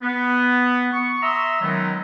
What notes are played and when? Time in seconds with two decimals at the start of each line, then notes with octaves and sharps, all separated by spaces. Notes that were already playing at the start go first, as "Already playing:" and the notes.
0.02 B3
0.93 C#6
1.22 E5 A#5 C6 D#6 E6
1.62 D#3 F#3 G#3 B3 C#4 D#4